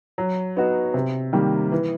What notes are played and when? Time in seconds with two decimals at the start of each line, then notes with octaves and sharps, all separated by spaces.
0.18 F#3
0.57 B3 D#4 F#4
0.94 C3
1.33 D#3 G3 A#3
1.72 E3